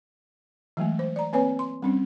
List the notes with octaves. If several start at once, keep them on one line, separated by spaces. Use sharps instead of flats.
E3 F#3 G#3 A3
C5
D5 A#5
A#3 C4 B4 C#5 G#5
C6
G3 C4 C#4